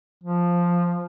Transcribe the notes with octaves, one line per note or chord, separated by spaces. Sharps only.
F3